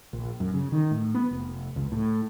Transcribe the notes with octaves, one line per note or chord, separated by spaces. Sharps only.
A#1
F#2
C#3
D#3
A2
B3
F1
C#2
A2